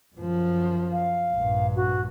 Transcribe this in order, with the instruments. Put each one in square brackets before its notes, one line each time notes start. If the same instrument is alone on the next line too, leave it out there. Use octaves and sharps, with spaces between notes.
[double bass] F#2 F3
[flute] F5
[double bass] A#1 G2
[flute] F#4